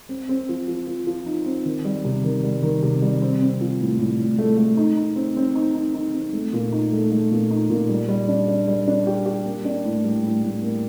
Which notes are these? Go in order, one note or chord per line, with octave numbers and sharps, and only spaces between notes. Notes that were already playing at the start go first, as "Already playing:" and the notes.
C4
C4
F3
F3
F3
F3
D#4
C4
D#3
G3
C3
D#3
G3
D#3
C3
G3
C4
C4
F3
A2
A2
A2
A3
A3
D#4
D#4
C4
C4
D#4
D#4
D#4
C4
A3
A#2
D#4
A3
A3
A#2
D#4
A#2
G3
G3
D4
D4
G3
D4
G4
G4
A#3
D4
A2
G3
A2
A2
A#3